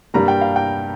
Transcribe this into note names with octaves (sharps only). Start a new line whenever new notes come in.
G2 G3 A#3 A#5
G5
F5
G5